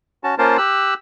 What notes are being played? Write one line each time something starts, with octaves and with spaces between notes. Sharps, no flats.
C#4 F#4 A5
A#3 C#4 F4 A#4 C5 A5
G4 E6 F#6